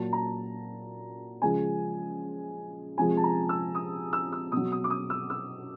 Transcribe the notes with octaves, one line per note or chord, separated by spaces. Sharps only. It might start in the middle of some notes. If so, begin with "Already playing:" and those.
Already playing: A#2 F#3 A5
A#5
C#3 F3 G#3 G#5
C3 F3 G#3 G#5
A5
A#5
E6
D#6
E6
E6
B2 F#3 D#6
D#6
D6
D#6
E6
E6